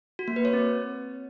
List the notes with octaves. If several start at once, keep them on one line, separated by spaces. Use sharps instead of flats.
F#4
A#3
B4
C#5
C4